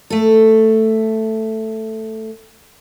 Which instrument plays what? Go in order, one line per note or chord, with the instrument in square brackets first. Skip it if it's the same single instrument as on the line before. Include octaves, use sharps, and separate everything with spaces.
[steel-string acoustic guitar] A3 A4